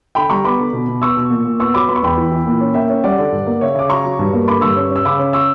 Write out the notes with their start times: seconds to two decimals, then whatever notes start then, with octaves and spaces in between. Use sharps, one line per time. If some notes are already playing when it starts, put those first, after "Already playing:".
0.15 D3 G5 B5
0.30 G3 A#5 C#6
0.44 B3 B5 D6
0.59 D3
0.73 B2
0.88 B2
1.02 B3 C#6 E6
1.17 B2
1.30 A#2
1.45 A#2
1.59 B3 C#6 E6
1.74 F#3 B5 D6
1.88 B3 B5
1.96 C#6
2.03 E2 G5 B5
2.17 E3
2.31 E3
2.46 A#2
2.61 C#4
2.74 A#3 E5 G5
2.89 C#4
3.04 G3 D5 F#5
3.18 D3
3.32 G2
3.47 A#3
3.61 C#3 C#5 E5
3.75 C#3 D6
3.89 F#3 A#5 C#6
4.05 F#3
4.19 G2
4.33 A#3
4.48 D3 B5 D6
4.61 G2 C#6 E6
4.76 C#4
4.90 C#4
4.96 E6
5.05 C#3 B5 D6
5.19 C#4
5.33 C#6 E6